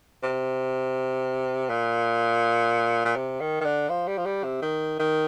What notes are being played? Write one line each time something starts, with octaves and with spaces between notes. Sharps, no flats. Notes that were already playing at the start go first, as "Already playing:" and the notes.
C3
A#2
A#2
C3
D#3
D#3
D3
F3
G3
F3
G3
C3
D#3
D#3